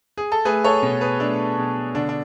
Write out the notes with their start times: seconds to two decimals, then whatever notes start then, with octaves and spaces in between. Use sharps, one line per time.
0.17 G#4
0.32 A4
0.45 A3 G#4 B4
0.64 A4 C#5
0.82 B2
1.01 G#4 B4
1.20 A3 D4
1.58 B2
1.95 D3 D4
2.09 D4